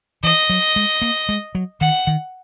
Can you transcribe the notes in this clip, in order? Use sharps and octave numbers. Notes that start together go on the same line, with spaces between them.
E3 D#5
F#3
G#3
A#3
G#3
F#3
D#3 F#5
D#3